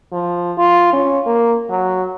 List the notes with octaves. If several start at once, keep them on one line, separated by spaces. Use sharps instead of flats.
F3
F4
C#4
A#3
F#3